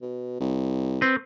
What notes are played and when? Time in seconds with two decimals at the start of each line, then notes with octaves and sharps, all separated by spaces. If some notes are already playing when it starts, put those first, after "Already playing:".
0.02 B2
0.40 C2
1.01 C4 B4